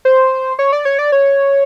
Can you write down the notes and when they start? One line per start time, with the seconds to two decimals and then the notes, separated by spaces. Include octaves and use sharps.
0.05 C5
0.59 C#5
0.73 D5
0.85 C#5
0.99 D5
1.12 C#5